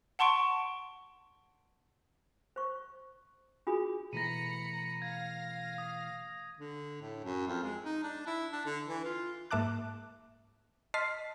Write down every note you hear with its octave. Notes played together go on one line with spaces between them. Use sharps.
F#5 A5 C6 C#6 D7
C5 C#6
D4 F4 F#4 G#4 B5 D#6
B2 E3 A3 A#5 B5 A#6 C#7 D#7
F5 G#6 A#6
D#6
D3
A2
F#2
F2
G#3
D#4
D4
E4
D4
D3
E3
F4
G#2 A#3 E5 A5 D6 F#6
D#5 A5 C6 F6 B6 C7